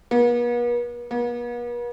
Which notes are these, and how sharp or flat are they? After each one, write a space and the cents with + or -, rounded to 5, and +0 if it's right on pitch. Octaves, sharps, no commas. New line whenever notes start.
B3 -45
B3 -45